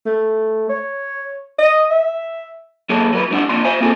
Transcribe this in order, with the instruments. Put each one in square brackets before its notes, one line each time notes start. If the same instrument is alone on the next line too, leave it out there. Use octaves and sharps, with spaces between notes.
[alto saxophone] A3
C#5
D#5
E5
[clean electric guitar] F#3 A#3 G#4 A4 C#5 A5
F#3 A#4 B4
F#2 A2 F#3 G3 D4 F#5
F2 A#2 D4 C6
C5 E5 G#5
A#3 C4 F4 G#4 A4